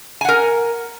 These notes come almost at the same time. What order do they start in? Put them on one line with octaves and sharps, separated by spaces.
G#5 F#5 A#4